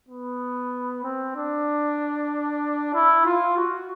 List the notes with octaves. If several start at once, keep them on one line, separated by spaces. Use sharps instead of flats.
B3
C4
D4
E4
F4
F#4